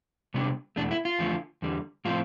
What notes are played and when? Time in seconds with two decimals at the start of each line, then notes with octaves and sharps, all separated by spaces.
0.34 C3 G3 B3 D4
0.76 E2 B2 A3 D4
0.91 E4
1.05 F4
1.19 E2 D3 F3 A3
1.62 E2 D3 G3
2.05 A2 F3 A3 C4 F4